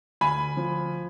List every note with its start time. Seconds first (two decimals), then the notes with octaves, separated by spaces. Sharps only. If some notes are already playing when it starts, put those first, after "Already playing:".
0.21 D2 G#5 B5
0.57 F3